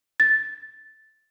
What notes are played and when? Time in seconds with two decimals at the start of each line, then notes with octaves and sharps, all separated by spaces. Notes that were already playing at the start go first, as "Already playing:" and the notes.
0.20 A6